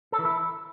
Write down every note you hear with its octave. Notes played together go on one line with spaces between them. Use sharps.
A4
E3
E4